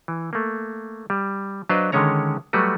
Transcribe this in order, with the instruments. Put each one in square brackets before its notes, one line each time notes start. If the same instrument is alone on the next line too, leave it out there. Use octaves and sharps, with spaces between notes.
[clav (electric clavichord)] E3
A3 A#3
G3
F#3 D4 B4 C5 D#5 F5
D3 D#3 G#3 C#4 C#5 A#5
F#3 G3 A3 F#4 B4